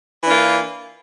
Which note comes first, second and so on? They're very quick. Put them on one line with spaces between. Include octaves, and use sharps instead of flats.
E3 D4 F4 A#3